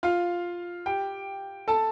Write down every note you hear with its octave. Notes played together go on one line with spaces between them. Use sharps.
F4 F5
G4 G5
A4 A5